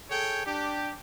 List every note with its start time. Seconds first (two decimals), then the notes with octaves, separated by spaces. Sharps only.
0.10 G#4 A4 C#5 G5
0.46 D4 G4